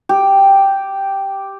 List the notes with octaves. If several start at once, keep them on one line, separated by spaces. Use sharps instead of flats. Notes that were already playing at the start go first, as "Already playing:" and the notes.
G4